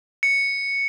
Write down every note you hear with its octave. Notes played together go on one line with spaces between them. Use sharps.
C#7